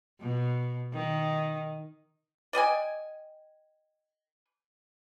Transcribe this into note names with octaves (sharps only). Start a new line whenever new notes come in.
B2
D#3
D5 D#5 G5 G#5